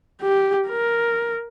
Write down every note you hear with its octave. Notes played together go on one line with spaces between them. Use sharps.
G4
A#4